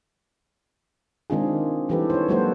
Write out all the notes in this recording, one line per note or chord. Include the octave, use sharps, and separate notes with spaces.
D#3 G#3 C4 D4 F4 G#4
D#3 E3 G3 G4 A4 B4
C5 C#5
F#3 G#3 A#3 F#4 A4 C5